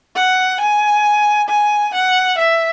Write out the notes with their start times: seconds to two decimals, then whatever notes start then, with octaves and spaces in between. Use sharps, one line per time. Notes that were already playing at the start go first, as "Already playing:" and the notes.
0.16 F#5
0.61 G#5
1.50 G#5
1.95 F#5
2.39 E5